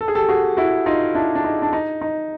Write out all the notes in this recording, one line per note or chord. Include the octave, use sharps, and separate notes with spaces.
A4
G#4
G4 A4
F#4 G#4
E4 F#4
D#4 F4
D4 E4
D4
D#4
D4
D#4
D#4